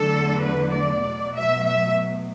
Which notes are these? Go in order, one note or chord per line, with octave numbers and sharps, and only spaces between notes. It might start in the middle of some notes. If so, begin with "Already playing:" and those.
Already playing: E2 D3 F#3 A3 A4
B4
D5
B2 F#3 A3
E5
E5